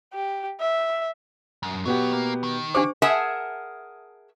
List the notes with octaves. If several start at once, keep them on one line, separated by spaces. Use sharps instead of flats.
G4
E5
F#2
B1 B2 F#3 B3 G4
A#3
D#3
D4 G4 C5 D6
G#4 A#4 E5 F#5 G#5 A5